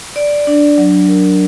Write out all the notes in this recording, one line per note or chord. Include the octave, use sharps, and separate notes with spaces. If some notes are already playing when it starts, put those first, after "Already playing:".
D5
D4
F#3
A#4